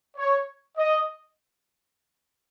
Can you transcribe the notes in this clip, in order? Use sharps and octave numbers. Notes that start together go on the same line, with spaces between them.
C#5
D#5